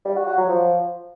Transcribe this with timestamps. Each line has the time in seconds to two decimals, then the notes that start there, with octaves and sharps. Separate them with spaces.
0.05 G3
0.16 F#4
0.27 F#4
0.38 F#3
0.49 F3